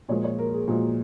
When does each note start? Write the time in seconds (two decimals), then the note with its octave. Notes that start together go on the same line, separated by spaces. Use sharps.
0.08 A#2 F3 G#3 C#5
0.24 C#5
0.39 A#4
0.54 G#4
0.68 A#2 F3 G#3 F#4